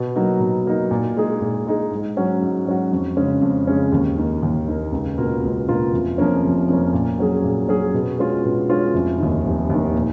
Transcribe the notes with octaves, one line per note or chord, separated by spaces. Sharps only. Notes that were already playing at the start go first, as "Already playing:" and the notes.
Already playing: B2
F#3 A#3 D#4
B2
F#3 A#3 D#4
A#2
G#3 D#4 G#4
A#2
G#3 D#4 G#4
G#2
F#3 C#4 F#4
G#2
F#3 C#4 F#4
F2
C#3 G#3 C#4
F2
C#3 G#3 C#4
D#2
D#3 A#3
D#2
D#3 A#3
C#2
B2 A#3 F4
C#2
B2 A#3 F4
F1
F2 F3 A#3 C#4
F1
F2 F3 A#3 C#4
A#2
F#3 C#4 G#4
A#2
F#3 C#4 G#4
B2
G#3 C#4 F4
B2
G#3 C#4 F4
F1
D#2 D#3
F1
D#2 D#3
A#2